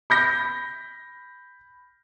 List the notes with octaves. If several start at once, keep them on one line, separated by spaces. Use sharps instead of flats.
B5 G6 A#6